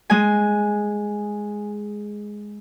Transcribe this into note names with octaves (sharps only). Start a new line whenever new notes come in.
G#3 G#5